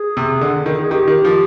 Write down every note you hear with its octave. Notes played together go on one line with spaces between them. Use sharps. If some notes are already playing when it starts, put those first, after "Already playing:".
Already playing: G#4
C3
D3
D#3
G#4
D#3 G4
D#3
F3